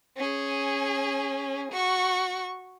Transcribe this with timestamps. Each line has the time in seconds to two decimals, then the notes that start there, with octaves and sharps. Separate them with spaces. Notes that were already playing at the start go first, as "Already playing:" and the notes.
0.17 C#4 G#4
1.72 F#4 C#6